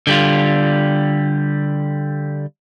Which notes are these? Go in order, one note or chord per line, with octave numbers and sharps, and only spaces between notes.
D3 G3 F4